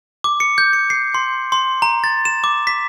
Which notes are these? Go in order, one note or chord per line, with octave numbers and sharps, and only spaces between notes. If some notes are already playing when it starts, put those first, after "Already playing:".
D6
C#7
G6
C#7
C7
C6
C6
A#5
A6
E7
D6
B6